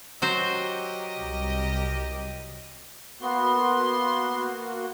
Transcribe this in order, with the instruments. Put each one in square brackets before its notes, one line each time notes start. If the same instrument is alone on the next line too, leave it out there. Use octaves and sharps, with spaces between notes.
[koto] F#3 F#4 C5 [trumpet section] G4 A#4 D#5
[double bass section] C2
[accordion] A#3 F#4 [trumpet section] B3 [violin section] C6